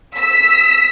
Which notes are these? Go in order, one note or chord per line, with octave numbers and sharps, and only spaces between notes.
E6 B6